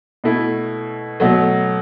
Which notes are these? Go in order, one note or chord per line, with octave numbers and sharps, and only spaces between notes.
B2 A3 E4
B2 F#3 A3